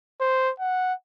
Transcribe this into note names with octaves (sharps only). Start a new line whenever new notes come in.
C5
F#5